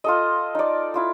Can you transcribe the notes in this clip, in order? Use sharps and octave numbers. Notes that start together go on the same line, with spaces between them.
F4 A4 D#5
D#4 D5
E4 F4 D6